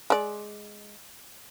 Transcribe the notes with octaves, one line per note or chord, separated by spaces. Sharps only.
G#3 D5